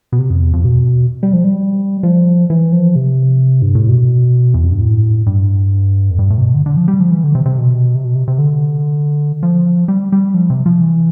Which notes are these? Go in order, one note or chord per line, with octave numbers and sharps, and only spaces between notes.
B2
C3
F2
E2
F2
B2
G3
F3
G3
F3
E3
F3
C3
G2
A2
B2
E2
F2
G2
A2
G2
F2
G2
A2
C3
B2
D3
D3
F3
G3
F3
E3
D3
C3
C3
B2
C3
B2
C3
C3
D3
F3
G3
G3
F3
C3
F3
E3